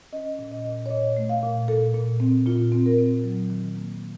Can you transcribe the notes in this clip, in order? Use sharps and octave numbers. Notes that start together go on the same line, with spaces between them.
C#4 D#5
A#2
D#5
A#2
C#5
A#2 D#5
A3
F5
A#2
A#2 A4
A#2
C4
A#2 F4
C4
A#4
C4
F#3
D#3
A#3